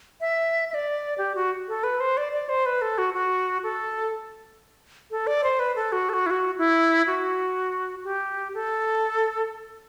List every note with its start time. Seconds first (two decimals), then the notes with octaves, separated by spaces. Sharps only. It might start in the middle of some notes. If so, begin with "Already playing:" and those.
0.21 E5
0.70 E5
0.74 D5
1.18 G4
1.35 F#4
1.68 A4
1.84 B4
2.00 C5
2.17 D5
2.33 D5
2.49 C5
2.66 B4
2.82 A4
2.98 F#4
3.14 F#4
3.63 A4
5.11 A4
5.27 D5
5.44 C5
5.59 B4
5.76 A4
5.92 F#4
6.09 A4
6.14 F#4
6.26 E4
6.31 F#4
6.58 E4
7.07 F#4
8.04 G4
8.54 A4